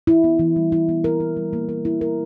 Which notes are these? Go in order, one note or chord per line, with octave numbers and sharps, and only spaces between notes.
E4
B3
E3
G3
E4
B3
A#4
E4
G3
A#3
A#4
E4
A#4